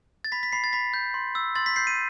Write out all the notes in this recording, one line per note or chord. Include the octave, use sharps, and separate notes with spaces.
A6
B5 B6
B6
B5 C7
A6
B5 B6
G6
C6
E6
C6 A6
B6
G6 C7
D#7